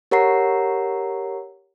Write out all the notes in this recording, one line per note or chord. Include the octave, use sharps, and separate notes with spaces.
G4 A#4 C#5 F#5 A#5 C7